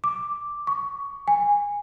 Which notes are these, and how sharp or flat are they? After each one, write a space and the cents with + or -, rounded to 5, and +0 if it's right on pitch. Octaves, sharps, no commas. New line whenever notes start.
D6 +0
C#6 +15
G#5 -20